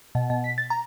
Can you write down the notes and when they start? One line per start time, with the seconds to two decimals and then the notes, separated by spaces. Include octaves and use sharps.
0.15 B2
0.30 B2
0.44 B6
0.58 A6
0.70 A#5